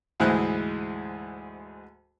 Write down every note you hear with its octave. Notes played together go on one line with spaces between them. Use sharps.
D2 G#2 E3 G#3 C5 F#6